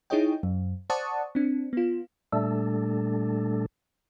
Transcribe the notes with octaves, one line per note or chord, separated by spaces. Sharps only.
D#4 E4 G#4 C#5 D#5 G5
F#2
C5 D5 F#5 A5 C#6 D#6
C4 D4
B3 F4
A#2 G3 A3 D4 A4